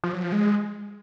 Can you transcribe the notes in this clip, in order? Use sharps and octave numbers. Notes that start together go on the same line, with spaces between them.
F3
F#3
F3
G#3